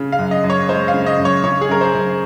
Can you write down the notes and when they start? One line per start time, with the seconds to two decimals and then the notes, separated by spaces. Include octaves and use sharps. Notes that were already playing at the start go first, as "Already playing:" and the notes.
Already playing: C#3
0.12 F5
0.19 F#2
0.31 D#5
0.44 F#2
0.50 C#5
0.69 G#3 C5
0.88 F5
0.94 C#3
1.06 D#5
1.19 F#2
1.25 C#5
1.44 C#3 C#5
1.61 G#4
1.69 F#2 A#4
1.81 C5
1.94 F#2